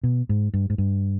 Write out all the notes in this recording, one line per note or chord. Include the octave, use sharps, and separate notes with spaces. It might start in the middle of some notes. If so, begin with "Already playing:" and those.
B2
G#2
G2
G#2
G2